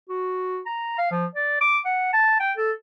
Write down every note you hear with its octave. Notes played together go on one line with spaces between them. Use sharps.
F#4
A#5
F5
F3
D5
D6
F#5
A5
G5
A4